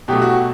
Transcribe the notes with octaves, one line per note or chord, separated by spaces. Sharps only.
B2 F#3 A3 G4
F#4